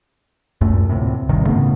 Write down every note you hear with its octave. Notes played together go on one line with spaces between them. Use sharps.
C#2 F#2 A#2 A3
D2 A2 C3
G#1 G2 C3 D#3
A2 C#3 A3 B3